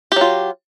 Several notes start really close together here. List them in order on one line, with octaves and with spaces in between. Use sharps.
G4 F#3 F4